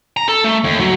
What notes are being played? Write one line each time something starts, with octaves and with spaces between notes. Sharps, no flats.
A#5
A4
A3
D#2
F#3